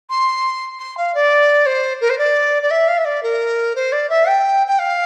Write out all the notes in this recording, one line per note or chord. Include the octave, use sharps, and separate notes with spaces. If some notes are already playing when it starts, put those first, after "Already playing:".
C6
C6
F5
D5
C5
A#4
C5
D5
D5
E5
F5
E5
D5
A#4
C5
D5
E5
G5
G5
F5